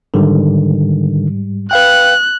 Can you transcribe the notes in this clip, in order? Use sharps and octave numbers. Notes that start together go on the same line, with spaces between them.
G#2 D3 D#3 G3
B4 F5 G5 F#6